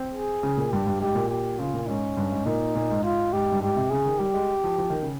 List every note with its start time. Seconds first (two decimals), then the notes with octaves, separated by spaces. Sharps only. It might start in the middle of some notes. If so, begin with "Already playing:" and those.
Already playing: C4
0.15 G#4
0.43 C#3
0.57 A#2
0.71 G2 G4
0.87 G2
1.01 G#2 G4
1.15 A#2
1.29 G4
1.59 C#3 F4
1.74 A#2
1.88 G#2 C#4
2.17 G2
2.32 G#2
2.46 A#2 D#4
2.75 A#2
2.90 G#2
3.04 F4
3.33 G#2 G4
3.52 G2
3.61 G#2 G4
3.76 C3
3.90 C#3 G#4
4.06 D#3
4.19 G3 G4
4.34 G#3
4.64 F3
4.78 F3
4.90 D#3
5.02 C#3